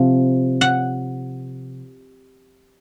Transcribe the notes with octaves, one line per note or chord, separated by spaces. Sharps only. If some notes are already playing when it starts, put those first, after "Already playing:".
Already playing: C3 F3
F#5